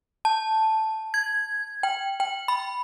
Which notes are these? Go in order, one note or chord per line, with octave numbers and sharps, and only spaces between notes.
A5
G#6
G5
G5
B5